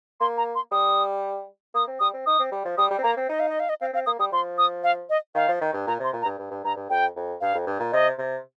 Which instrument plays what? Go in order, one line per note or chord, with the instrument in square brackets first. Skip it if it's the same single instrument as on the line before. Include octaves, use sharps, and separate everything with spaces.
[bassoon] A#3 [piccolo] C6
[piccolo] A#5
C6
[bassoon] G3 [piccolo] D#6
[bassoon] A#3 [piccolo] D#6
[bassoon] C4
[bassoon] G3 [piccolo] D#6
[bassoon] C4
[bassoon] D#4 [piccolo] D#6
[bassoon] C4
G3
F3
[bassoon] G3 [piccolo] D#6
[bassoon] G3
C4
[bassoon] A#3 [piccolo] A#5
[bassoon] C4
[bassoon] D#4 [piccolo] D#5
[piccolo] F5
D#5
F5
D#5
[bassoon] C4 [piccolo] F5
[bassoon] C4 [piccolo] F5
[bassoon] A#3 [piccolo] D#6
[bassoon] G3 [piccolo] D#6
[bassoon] F3 [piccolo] C6
[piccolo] D#6
F5
D#5
[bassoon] D#3 [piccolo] F5
[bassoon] F3
D#3
G2
[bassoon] A#2 [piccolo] A#5
[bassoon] C3
[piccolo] C6
[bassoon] A#2
[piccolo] A#5
[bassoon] G2
G2
G2
[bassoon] G2 [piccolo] A#5
[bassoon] G2
[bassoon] F2 [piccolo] G5
[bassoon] F2
[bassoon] G2 [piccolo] F5
[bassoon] F2
G2
A#2
[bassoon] C3 [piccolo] D#5
[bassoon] C3